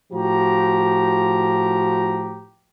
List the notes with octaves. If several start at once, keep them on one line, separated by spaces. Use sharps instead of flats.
A2 F3 F#4 G4 A#5